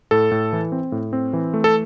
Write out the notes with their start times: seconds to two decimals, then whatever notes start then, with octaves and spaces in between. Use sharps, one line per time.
0.11 A2 A4
0.32 A2
0.53 E3
0.72 C4
0.92 A2
1.13 C4
1.33 E3
1.54 A3
1.64 A4